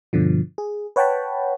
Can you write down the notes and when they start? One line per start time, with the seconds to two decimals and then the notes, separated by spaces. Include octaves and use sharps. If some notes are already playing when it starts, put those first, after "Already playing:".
0.13 G2 B2 D3 F3
0.58 G#4
0.96 B4 C#5 F#5 G5 A5 B5